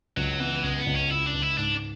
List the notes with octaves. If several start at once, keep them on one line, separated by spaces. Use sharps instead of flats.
C#2 F#3
E3 B3
C#2 G#3
B3
C#2
C#4
C#2 E4
D4
C#2
E4
G#2 D4